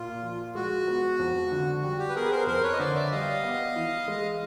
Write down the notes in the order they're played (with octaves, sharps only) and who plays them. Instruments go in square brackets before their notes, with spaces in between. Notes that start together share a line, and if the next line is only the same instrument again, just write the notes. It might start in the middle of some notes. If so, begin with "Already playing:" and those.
Already playing: [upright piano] A#2 [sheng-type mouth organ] F4
[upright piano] F3
[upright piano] G#3 [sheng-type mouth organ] F#4
[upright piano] B3
F2
D3
[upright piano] G3 [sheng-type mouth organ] F#4
[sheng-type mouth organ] G4
B4
[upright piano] B3 [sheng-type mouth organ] G#4 A#4
[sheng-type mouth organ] B4
A#4 C5
[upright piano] F2 [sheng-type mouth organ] A#4 C5
[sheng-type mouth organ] B4 C#5
D#5
[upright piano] D3 [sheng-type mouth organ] C5 D5
[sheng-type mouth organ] D5 E5
[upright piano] G3 [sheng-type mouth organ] D#5 F5
[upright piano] B3
E3
G#3